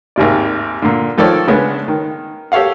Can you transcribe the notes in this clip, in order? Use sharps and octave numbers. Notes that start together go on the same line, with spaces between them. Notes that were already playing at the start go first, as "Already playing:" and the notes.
G#1 D#2 C3 D5
A#2 D3
D#3 F3 A4 C#5 D5
C#3 G#3 B3 C#4 D4
D#3
G4 A4 C#5 F5 F#5